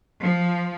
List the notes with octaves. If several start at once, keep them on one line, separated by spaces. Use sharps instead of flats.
F3